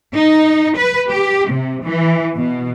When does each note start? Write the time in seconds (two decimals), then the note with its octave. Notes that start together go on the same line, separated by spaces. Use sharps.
0.14 D#4
0.76 B4
1.09 G4
1.50 C3
1.85 E3
2.35 B2